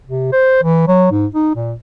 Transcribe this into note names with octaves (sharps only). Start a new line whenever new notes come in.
C3
C5
E3
F#3
G#2
D#4
A#2